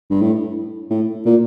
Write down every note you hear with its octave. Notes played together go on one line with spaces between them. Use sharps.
G2
A2
A2
A#2